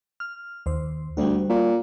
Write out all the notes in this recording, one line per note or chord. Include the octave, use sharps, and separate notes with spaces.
F6
D#2 C5
D2 G3 F#4
A#2